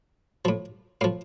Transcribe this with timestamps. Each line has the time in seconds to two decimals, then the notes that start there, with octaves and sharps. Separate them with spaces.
0.45 A2 F3
1.01 A2 F3 F5